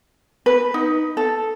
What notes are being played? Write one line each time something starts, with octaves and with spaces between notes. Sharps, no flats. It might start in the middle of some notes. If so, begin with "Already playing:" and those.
B4
D#4
A4